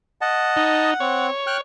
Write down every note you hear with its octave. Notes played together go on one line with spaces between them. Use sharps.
D#5 F#5 A5
D#4
C4 C#5
G5 F6 F#6